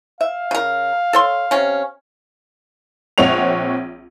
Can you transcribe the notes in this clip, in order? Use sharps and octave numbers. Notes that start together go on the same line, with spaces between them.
E5 F5
C#3 A#4
A4 C#5 C6
C3 C#4
A#1 C4 C#5 F#5 F7